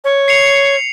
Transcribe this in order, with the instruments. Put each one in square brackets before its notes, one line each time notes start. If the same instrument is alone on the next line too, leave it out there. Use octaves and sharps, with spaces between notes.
[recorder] C#5
[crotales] C7 C#7 F7